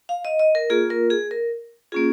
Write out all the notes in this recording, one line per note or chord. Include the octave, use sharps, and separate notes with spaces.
F5
D#5
D#5
A#4
A#3 F4 G#4
A#4
G#4
A#4
A#3 C#4 F4 G#4